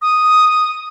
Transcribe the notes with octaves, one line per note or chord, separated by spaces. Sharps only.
D#6